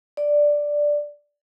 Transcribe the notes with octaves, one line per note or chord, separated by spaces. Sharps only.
D5